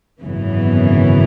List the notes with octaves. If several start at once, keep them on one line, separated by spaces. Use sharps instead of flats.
G#1 F#2 C#3 E3 B3